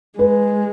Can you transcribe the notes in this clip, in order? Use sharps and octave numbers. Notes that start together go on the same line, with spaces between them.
G#3 B4